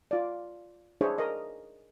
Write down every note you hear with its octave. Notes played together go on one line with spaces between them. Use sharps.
F4 D5
D4 E4 G#4 C5 C#5
A#4 D#5